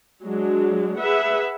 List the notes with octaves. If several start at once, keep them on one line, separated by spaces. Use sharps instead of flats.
F#3 G#3 D4
G#4 B4 E5 F#5